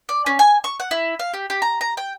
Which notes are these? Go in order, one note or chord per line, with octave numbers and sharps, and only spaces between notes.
D5
C#4
G#5
C#6
F#5
E4
F5
G4
G4
A#5
A#5
G5